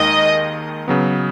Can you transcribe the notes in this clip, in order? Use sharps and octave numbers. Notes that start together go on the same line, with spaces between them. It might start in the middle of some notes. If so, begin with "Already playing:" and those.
Already playing: D#2 D#3 G#3 D#4 D#5
C#3 F#3 B3